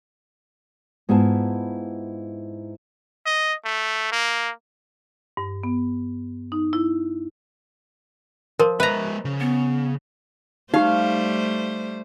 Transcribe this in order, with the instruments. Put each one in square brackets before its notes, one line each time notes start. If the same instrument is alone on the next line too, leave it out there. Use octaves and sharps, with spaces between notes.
[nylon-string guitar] G#2 B3 E4 F4 G#5 A5
[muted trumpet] D#5
A3
A#3
[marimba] G2
B3
D#4
E4
[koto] F3 [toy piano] A#4
[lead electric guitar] G#3 E5 [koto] B4 A#5
[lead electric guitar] C#3
[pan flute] B3
[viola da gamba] G3 A3 C5 [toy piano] D#4 G4 [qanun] F5